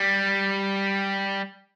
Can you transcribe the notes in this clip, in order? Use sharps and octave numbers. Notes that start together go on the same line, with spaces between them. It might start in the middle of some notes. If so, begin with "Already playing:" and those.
Already playing: G3